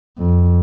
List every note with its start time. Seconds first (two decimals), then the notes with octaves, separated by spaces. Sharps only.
0.18 F2